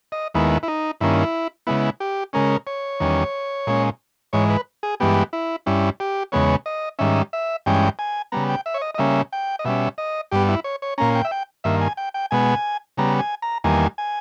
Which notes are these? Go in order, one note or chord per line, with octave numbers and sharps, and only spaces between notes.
D#5
D#2 D#3 G#3 B3 E4
E4
D#4
G2 D#3 A#3 C#4 E4
C#3 G#3 B3 E4
G4
C#3 G#3 C#4 A#4
C#5
E2 D#3 G3 C#4
A#2 G#3 C#4
G#2 E3 G#3 C#5
B4
G#4
G2 E3 G#3 B3 G4
E4
G2 G3 C#4 E4
G4
E2 C#3 G#3 B3 C#5
D#5
G#2 D#3 G3 C#4 E5
E5
G2 E3 G#3 C#4 G5
G#5
C#3 G3 B3 A#5
G5
E5
C#5
D#5
D#5
C#3 G3 A#3 C#4 E5
G5
D#5
B2 G3 C#4 E5
D#5
G2 G3 B3 G4
E4
C#5
C#5
A#2 A#3 C#4 A#5
G5
E5
G5
G2 D#3 A#3 E5
G#5
G5
G5
B2 G#3 B3 G#5
C#3 G3 B3 A#5
G#5
A#5
E2 D#3 G3 A#3 G#5
G#5